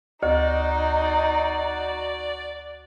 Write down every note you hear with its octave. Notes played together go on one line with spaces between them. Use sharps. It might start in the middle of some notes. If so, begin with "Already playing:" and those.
D2 D#4 F#4 D5